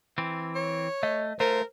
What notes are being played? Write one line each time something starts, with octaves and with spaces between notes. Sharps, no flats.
E3 C4
C#5
A3 D#5
A3 F4 A#4 C5